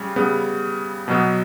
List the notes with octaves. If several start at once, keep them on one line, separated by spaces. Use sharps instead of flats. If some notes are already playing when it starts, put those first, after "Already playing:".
Already playing: C#3 G3
C#3 G3 B3
B2 F#3 B3